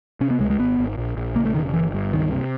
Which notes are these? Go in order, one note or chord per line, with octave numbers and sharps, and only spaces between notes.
C3 C#4
B3
C#2 G#3
G#3
G#1 B3
G#1
A#1
A#1
C#3 A#3
A3
E1 D#3
G1 E3
G2
C#2 D#3
C3